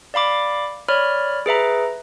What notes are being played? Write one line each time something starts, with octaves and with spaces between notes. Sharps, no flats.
D5 F5 B5 D6
C#5 D5 B5 F6
G#4 B4 E5 A#5